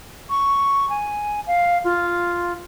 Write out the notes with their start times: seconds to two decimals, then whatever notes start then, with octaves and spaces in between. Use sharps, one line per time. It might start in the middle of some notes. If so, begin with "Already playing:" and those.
0.30 C#6
0.90 G#5
1.47 F5
1.84 F4